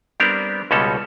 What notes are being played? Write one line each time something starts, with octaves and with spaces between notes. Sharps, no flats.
G3 B3 C4 D4 G4 A#4
C#2 B2 G3 G#3 C#4 A4